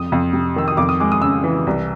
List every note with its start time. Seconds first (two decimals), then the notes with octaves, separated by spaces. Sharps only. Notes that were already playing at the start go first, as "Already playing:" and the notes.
Already playing: F2 D#6
0.12 F2
0.33 C3
0.56 D#3 E6
0.68 D#6
0.77 F2 D6
0.89 D#6
1.00 G#3 D6
1.12 D#6
1.22 C#3 E6
1.44 E3
1.67 C2